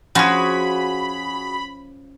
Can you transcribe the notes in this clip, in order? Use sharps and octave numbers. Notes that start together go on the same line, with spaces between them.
F3 C#4 F4 F#4 G#4 B5